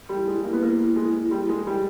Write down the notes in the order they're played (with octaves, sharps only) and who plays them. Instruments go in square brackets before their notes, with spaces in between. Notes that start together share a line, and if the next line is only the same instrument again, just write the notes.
[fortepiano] G3
[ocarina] E4
[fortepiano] G#3
[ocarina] E4
[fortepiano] A#3
B3
A#3
G#3
G3
G#3
G3